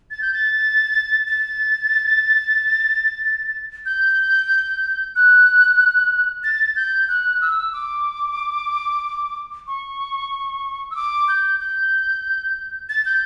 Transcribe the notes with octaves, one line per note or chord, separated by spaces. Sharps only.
A6
G6
A6
A6
G6
F#6
A6
G6
F#6
E6
D6
C#6
E6
D6
G6
G6
A6
G6